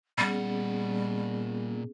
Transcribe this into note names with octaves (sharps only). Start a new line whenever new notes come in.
A#2 G3 B3 C#4 G#4 F#5